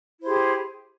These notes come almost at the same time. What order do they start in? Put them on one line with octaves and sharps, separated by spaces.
E4 C5 G4 G#4